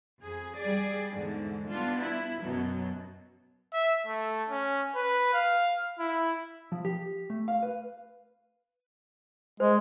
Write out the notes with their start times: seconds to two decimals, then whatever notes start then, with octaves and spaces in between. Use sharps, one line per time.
0.21 F2 G#4
0.57 G3 G#4 D5
1.12 E2 G#2 D3
1.69 G3 B3 D4 F4
1.99 E4
2.41 F#2 B2 F#3
3.74 E5
4.07 A3
4.49 C#4
4.96 B4
5.33 F5
5.99 E4
6.72 F3
6.85 G4
7.30 A3
7.48 F5
7.63 B4
9.60 G#3 C5